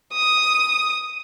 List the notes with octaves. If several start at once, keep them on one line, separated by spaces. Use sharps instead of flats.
D#6